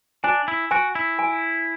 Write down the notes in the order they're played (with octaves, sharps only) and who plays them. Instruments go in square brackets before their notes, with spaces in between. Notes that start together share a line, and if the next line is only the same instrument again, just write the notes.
[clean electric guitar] D4 [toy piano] G#5
[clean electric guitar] E4
[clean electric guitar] F#4 [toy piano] G#5
[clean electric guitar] E4
[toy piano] G#5